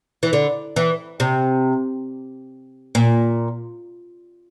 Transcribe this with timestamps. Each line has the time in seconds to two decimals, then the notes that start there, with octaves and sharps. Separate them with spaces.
0.23 E3
0.33 D3
0.76 E3
1.20 C3
2.95 A#2